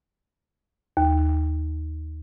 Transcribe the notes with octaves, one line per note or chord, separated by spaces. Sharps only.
D#2